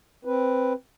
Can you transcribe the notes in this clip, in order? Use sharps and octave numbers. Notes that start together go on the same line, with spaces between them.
C4 B4